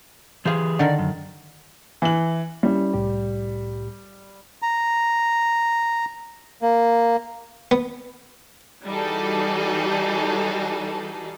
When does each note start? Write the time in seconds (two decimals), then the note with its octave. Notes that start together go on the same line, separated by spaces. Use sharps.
0.45 E3 F4 G4 G#4 C5
0.79 D3 D#3 A#4 D5
0.99 F#2
2.02 E3 F#7
2.63 G3 C#4 E4
2.94 C2 A2 G4
4.62 A#5
6.62 A#3
7.71 B3
8.85 E3 G3 D#4 F#4 G#4 A4